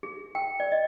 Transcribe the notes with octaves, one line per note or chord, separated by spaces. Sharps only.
G#4
G5
D5
D#5